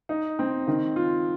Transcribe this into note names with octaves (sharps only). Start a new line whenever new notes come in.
D#4
C4
D#3
F4